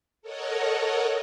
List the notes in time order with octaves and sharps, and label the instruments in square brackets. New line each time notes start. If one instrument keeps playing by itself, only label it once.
[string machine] A4 A#4 C#5 D#5 F#5